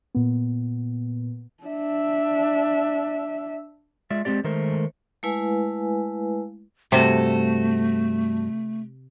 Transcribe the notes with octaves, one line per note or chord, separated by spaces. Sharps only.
A#2 B3
D4 E5
G#3 F4 D5 E5
G#3 A#3 C4 G4 D5
D#3 G#3 A3 A#4 C5
G#3 A3 E4 B4 F5 G#5
G2 C3 A3 F#4 A4